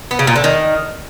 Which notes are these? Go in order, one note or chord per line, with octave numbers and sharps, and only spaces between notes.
B3
C#3
A#2
D3
D#3